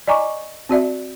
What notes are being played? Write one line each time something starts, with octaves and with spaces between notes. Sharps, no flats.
D5 D#5 G#5 A#5 C#6 D6
C4 F#4 D5 E5